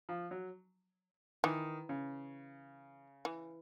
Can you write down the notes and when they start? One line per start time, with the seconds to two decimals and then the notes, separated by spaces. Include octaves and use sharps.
0.09 F3
0.31 F#3
1.44 D#3 E3
1.89 C#3
3.25 E3